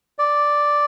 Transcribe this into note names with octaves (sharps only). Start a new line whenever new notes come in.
D5